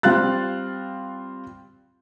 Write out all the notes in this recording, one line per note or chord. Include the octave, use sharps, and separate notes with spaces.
G3 C4 F4 F5 F#6 A6